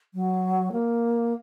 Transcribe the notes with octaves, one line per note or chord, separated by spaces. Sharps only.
F#3
A#3